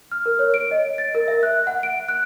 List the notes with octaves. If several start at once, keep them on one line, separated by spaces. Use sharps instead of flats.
F6
A#4
C#5
D7
D#5
A6
A#4
E5
F#6
F#5
D7
F#6